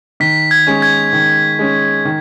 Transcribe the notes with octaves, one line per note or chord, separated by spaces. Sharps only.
D#3 B6
G#6
G#3 C#4
G#6
D#3
G#3 C#4
D#3